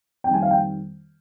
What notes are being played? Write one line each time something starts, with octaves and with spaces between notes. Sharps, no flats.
F2 D#3 G3 C4 G5
G#5
F5
G5